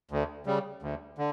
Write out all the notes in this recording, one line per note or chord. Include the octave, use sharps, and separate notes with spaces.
D2
C#3 G3
D2
D3